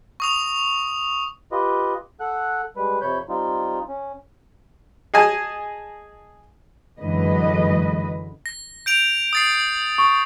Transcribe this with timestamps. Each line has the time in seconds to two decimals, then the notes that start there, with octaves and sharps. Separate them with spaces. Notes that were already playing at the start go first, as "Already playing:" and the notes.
0.20 C#6 D#6 F7
1.52 F4 G4 B4 D#5
2.20 A4 F#5 F#6
2.76 G3 G#3 B4
3.02 F2 C3 C#5 B5 G6
3.29 G3 C4 D#4 F4
3.88 C#4
5.14 G#4 D#5 G#5 A5
7.00 F#2 D3 E3 G#3 B4 D#5
8.46 A#6
8.86 G6 D7 F7
9.33 D#6 A6 C7
9.98 C#6